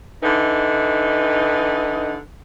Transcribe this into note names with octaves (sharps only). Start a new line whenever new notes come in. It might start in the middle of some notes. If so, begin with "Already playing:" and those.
D3 E3 D#4